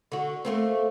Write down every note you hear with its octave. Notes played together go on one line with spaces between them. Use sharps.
D3 F#4
A3 A#3 C4